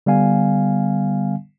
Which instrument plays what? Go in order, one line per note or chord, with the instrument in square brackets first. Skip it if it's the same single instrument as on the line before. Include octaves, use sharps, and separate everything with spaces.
[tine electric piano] D3 G3 B3 F5 G#5